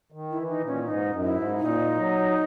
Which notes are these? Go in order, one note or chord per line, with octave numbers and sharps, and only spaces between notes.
D#3
E4
E3
D#4
A#2
C#4
G#2 D#4
F#2
E4
G#2
A#2 D#4
F#3